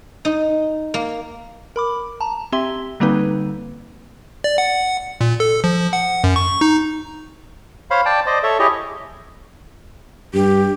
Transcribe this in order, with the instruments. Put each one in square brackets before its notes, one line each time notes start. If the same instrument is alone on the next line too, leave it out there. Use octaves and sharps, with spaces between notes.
[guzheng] D#4
A#3
[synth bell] A#4 B5 D6
A5 A#5
C4 G4 E5 C6 G7
D3 G3 A#3 C4 D#4 B4
[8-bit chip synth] D5
F#5
A#2
A4
F3
F#5
F#2
C#6
D#4
[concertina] C5 C#5 F5 B5
D5 G5 A5
C5 D5 D#5
A4 C#5 E5
E4 G4 G#4 C#5 D#5
[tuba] G2 [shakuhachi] G4